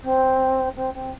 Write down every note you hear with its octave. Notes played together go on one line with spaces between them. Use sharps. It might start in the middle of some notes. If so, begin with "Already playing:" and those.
C4
C4
C4